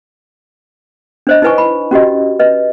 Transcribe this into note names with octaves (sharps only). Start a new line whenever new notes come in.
D4 C5 D#5
D#4 E4 B4 G#5 C#6
B5
C#4 F#4 G4 D#5
B4 D#5